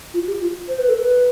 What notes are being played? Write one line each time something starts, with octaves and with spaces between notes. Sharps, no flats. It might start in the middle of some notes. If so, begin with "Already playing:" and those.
F4
G4
F4
C5
B4
A4
B4